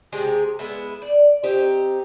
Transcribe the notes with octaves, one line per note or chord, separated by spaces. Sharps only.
C3 G#3 G4 G#4
G#3 B3 E4
D5
C4 D#4 G4